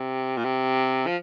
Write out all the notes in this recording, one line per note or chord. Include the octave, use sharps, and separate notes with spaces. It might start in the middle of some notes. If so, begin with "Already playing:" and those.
Already playing: C3
A#2
C3
F3